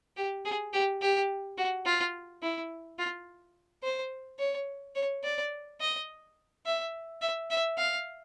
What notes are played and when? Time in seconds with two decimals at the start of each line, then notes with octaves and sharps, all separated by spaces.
0.17 G4
0.45 G#4
0.73 G4
1.01 G4
1.58 F#4
1.86 F4
2.42 E4
2.99 F4
3.83 C5
4.39 C#5
4.96 C#5
5.24 D5
5.81 D#5
6.66 E5
7.22 E5
7.51 E5
7.78 F5